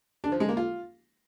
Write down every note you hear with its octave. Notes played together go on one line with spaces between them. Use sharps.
D4
F3
G#3
A#3
F4